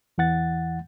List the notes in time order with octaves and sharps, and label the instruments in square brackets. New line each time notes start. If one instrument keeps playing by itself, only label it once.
[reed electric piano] E2 E3 F#5 A6